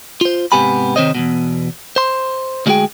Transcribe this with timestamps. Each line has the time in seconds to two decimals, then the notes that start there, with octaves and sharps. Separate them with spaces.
0.21 F4 C5
0.52 G#2 C3 B3 G4 G#5 B5
0.96 C3 D#3 C4 C5 C#5 D#5
1.15 E2 G2 B2
1.96 C5 C6
2.66 D2 G3 G#3 F#4 G#4 G5